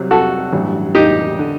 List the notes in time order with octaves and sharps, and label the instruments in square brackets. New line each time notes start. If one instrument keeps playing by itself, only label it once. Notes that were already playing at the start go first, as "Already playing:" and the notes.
Already playing: [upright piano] C2 C3 F#3 C4
[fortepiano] F#4 A4
[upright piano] A1 G2 F#3
[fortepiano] D#4 G4
[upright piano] D3